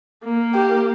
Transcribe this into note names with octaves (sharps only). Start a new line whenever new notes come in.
A#3
G4